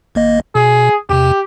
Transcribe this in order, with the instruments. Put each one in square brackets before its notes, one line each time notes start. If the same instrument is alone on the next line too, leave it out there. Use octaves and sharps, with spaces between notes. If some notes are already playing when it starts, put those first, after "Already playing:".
[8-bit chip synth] G#1 A#3 D#5
[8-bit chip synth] B2 [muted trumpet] G#4
[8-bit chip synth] E2 C3 [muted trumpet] G4